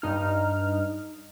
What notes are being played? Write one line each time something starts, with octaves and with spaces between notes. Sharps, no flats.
G2 D#4 F6